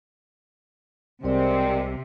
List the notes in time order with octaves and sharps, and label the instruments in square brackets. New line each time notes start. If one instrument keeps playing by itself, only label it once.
[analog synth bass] C2 [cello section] C3 [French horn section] G#3 C4 [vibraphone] A#4 D5